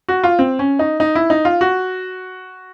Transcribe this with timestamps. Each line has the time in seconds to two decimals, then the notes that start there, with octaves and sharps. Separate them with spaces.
0.08 F#4
0.24 F4
0.39 C4
0.59 C#4
0.79 D#4
1.00 D#4
1.15 E4
1.30 D#4
1.45 F4
1.61 F#4